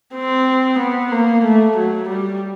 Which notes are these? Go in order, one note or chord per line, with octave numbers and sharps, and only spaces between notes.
C4
B3
A#3
A3
F#3
G3